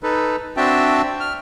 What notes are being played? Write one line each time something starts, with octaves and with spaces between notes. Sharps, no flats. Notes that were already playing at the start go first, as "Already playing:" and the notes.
D#4 A4 B4
C4 D4 F#4 E5 G5 A5
F6